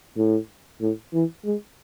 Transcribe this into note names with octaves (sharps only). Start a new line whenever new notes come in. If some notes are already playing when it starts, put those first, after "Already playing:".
A2
A2
E3
G#3